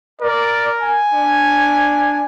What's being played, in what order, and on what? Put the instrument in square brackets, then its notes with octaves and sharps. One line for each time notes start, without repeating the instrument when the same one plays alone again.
[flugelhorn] A#4 [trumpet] D5
[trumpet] G#5
[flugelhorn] D4